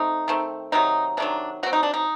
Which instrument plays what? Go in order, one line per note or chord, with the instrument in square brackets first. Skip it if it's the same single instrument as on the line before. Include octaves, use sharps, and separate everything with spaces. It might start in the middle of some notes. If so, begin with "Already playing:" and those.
Already playing: [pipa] A3 C4 D#4
D#3 A3 C4
C3 D#3 F#3 D#4
C3 D#3 F#3 D4
F#3 C4 F#4
D#4
D4
D#4